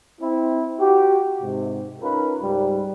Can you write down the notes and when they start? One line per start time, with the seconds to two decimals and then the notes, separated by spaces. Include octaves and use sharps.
0.20 C4 E4
0.80 F#4 G4
1.42 G#2 C3
2.01 C#4 D#4 F4 A#4 B4
2.42 C#2 G#2 G3